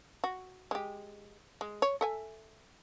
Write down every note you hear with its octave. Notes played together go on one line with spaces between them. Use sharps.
F#4
G#3 G4
G#3
C#5
A4 E5 G#5